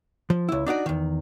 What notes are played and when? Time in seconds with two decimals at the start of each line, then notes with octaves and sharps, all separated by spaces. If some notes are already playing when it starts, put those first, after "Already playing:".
0.30 F3
0.49 C#2 E4
0.66 D4 D#4 F#4 D5
0.86 E2 D#3